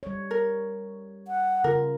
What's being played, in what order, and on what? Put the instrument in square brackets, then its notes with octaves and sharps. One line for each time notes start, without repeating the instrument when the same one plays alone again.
[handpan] G3 C#5
[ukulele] A#4
[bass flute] F#5
[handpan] C#3 F4 [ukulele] A#4